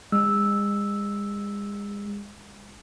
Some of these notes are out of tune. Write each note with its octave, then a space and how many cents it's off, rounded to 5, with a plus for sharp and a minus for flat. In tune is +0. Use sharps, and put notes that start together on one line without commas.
G#3 -35 E6 -5